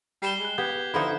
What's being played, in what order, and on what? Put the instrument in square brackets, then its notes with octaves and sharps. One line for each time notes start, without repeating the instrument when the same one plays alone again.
[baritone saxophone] G3 [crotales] C7 E7 G7
[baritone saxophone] G#3 [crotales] F#6 E7
[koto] B3 [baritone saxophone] G4 [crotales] G6 G#6 B6
[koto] D3 F3 D#4 [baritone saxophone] E4